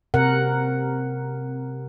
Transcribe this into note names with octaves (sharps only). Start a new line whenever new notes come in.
C3 A#4 F#5